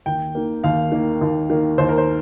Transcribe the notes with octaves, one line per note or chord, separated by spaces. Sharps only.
D#2 G5
D#3 A#3
D#2 F5
D#3 A#3
D#2
D#3 A#3
D#2 C5
A#4
C5